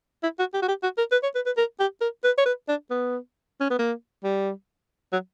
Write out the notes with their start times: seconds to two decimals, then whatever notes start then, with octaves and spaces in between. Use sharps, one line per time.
0.23 E4
0.39 F#4
0.54 G4
0.62 F#4
0.68 G4
0.83 F#4
0.98 A#4
1.12 B4
1.23 C#5
1.35 B4
1.46 B4
1.57 A#4
1.80 G4
2.01 A#4
2.24 B4
2.38 C#5
2.46 B4
2.68 D4
2.90 B3
3.60 C#4
3.70 B3
3.79 A#3
4.24 G3
5.13 F#3